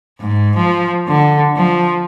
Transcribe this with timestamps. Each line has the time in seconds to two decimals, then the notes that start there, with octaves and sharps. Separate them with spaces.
0.20 G#2
0.56 F3
1.08 D3
1.56 F3